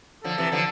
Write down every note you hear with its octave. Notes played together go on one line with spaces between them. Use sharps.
D3 F3 A4
C3 E3
D3 F3